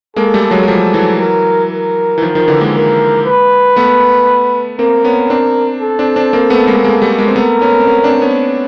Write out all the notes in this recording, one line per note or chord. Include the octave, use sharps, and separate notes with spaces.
G#3 A#3 A4
G3 A3
F#3 G#3
G#3
F3 G3 A4
E3 F#3
A#4
A#4
E3
D#3 F3
D#3 F3
D3 E3
G#3 A#3
A#4
B4
A3 B3
A#3 C4 A#4
B3 C#4
C4 D4
A4
C4 D4
C4 D4
A#3 C4
A3 B3
G#3 A#3
G#3 A#3
G3 A3
G#3 A#3
C4
A3 B3 A#4
B3 C#4
C4
B3 C#4
C4 D4
B3 C#4